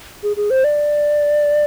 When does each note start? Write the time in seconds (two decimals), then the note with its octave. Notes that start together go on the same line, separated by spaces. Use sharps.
0.23 G#4
0.37 G#4
0.50 C5
0.64 D5